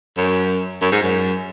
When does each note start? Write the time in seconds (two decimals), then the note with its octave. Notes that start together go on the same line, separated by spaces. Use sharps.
0.17 F#2
0.81 F#2
0.92 G#2
1.03 F#2